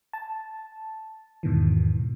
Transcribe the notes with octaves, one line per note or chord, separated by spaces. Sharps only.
A5
E2 G#2 B2 D#3 E3